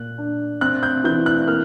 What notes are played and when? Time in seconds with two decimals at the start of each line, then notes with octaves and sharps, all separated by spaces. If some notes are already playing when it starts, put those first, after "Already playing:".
Already playing: A#2 F#6
0.18 D4
0.61 C4 F#6
0.83 G6
1.04 E3 G6
1.26 F#6
1.48 A#3 F6